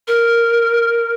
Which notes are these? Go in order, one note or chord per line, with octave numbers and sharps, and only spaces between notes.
A#4